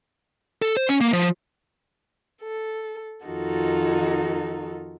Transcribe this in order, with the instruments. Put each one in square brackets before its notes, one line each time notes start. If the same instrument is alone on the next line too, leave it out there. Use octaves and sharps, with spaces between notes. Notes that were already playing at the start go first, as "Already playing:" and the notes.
[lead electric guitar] A4
C5
C#4
A#3
F3
[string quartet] A4
F2 D#3 D#4 F4 F#4 A4